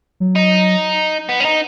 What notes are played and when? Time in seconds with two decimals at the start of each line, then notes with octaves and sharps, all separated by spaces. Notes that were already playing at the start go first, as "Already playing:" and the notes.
0.20 F#3
0.35 D#4
1.29 B3
1.40 C#4
1.45 D#4